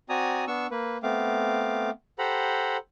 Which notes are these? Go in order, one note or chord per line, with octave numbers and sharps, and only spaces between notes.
C4 F#4 D5 G#5 A#5 D#6
B3 D4 C#6 E6
A#3 B4
A3 B3 C4 F5 D6
G4 A4 C5 F#5 A#5 B5